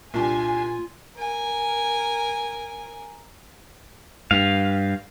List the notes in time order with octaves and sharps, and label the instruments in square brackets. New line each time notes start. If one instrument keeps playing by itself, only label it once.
[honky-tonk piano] C2 D4 G4 [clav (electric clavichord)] A#2 [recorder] F4 [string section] G#5
[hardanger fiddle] A#4 G#5
[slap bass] G2 [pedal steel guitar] F5